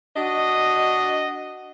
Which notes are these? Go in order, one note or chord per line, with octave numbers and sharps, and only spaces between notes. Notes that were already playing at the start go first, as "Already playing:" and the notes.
D4 F#4 D#5